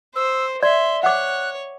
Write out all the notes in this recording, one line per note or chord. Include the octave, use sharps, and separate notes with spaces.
C5 E6
D5 E5 C6
C#5 F#5 D6 F#6